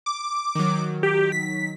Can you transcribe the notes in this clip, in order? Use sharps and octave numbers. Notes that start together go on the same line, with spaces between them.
D6
D#3 F#3
G4
B6